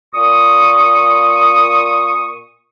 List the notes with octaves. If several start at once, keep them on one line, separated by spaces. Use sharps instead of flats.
A#2 C#6 D#6